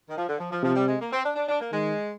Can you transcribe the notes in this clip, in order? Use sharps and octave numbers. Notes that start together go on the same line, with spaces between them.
D#3
F3
D3
F3
F3
C3 F3
G3
G#3
A#3
C4
D4
D4
D4
A#3
D#3 G#3